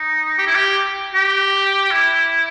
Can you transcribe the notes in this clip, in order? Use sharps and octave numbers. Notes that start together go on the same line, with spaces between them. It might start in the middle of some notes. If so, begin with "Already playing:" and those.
Already playing: D#4
G4
E4
G4
G4
E4